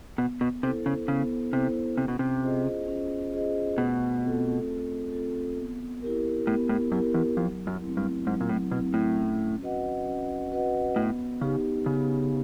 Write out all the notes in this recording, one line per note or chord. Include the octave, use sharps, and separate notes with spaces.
B2 B3
B2
C3 E4 A4 C5
C#3
C#3 B3
C3 E4 A4 C5
C3 C#4
B2
C3
F4 G#4 C5 D#5
C#4
F4 G#4 C5 D#5
B2 A3
C4 F4 A4
A3
C4 F4 A4
B3
E4 G4 A#4
A2 B3
A2
F#2 E4 G4 A#4
E2
F2 F#3
F#2
A3 C4 E4
G2
G#2 F#3
A#2
A2
B2 A3 C4 E4
A2
C#4
F#4 B4 D#5 F#5
C#4
F#4 B4 D#5 F#5
A2 B3
C#3 D#4 G4
C#3 B3